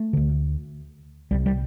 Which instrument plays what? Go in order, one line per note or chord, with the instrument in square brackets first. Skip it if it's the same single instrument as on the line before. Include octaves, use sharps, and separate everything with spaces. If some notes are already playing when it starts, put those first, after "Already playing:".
Already playing: [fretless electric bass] A3
D2 D3
C2 G3
C3
G3